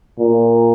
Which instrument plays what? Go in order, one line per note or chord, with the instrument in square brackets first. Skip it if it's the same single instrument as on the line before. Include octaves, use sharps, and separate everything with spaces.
[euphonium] A#2